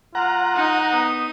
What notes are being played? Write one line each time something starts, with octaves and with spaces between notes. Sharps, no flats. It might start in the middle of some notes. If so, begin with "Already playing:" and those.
F4 F#5 A#5
D#4 D#6
B3